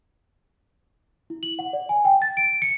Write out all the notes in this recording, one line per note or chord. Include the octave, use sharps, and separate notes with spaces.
E4
F#7
F#5
D5
G#5
G5
A6
D7
C#7